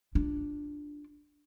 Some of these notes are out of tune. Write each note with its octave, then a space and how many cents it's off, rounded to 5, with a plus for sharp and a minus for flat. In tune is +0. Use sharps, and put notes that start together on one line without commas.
D4 +0 F4 +0